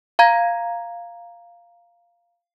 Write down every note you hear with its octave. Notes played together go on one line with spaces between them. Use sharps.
F5 A#5 G#6